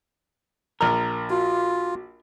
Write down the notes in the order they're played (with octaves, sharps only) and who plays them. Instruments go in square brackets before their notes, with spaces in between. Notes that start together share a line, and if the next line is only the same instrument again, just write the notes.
[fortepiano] A#1 F6 [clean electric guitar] A#4
[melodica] F4 [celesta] F#4